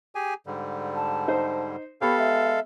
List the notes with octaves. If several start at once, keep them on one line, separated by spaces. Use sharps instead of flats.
G4 G#4 G#5
G#2 D3 G3
A5
D#4 C5
B3 G4 A4 C#5 F5 B5
G#3 E5